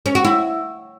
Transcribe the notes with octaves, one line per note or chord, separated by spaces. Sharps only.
C#4
F#4
E4